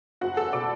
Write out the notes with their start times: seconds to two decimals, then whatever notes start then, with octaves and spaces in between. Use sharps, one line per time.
0.21 F#1 F#4 F#5
0.37 E2 A4 A5
0.53 B2 D5 D6